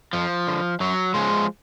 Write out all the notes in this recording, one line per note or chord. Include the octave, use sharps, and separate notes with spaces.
F2 F3
D3
F#2 F#3
C#3 F3 G#3